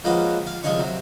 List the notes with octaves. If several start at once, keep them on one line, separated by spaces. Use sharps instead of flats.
F3 G#3 A#3 C#4 F#4 B4
F5
C2 F3 G#3 C#4 C#5 C#6
C3 F#3